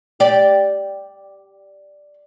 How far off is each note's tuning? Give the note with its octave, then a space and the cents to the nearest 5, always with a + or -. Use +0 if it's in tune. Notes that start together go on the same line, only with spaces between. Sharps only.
G4 +0 D5 +0